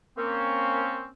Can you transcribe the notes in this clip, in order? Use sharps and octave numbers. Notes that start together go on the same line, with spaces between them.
A#3 C4 C#4